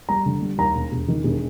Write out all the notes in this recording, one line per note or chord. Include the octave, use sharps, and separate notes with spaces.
G3 A#5
D3
G3
D#2 A#5
E1
E1
D#3
E1